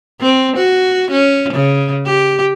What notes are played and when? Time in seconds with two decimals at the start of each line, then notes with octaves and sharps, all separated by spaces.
0.21 C4
0.56 F#4
1.11 C#4
1.53 C#3
2.06 G4